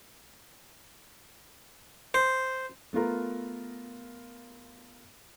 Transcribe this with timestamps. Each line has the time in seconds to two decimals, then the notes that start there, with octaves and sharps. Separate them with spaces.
2.14 C5
2.93 A3 B3 F4 A#4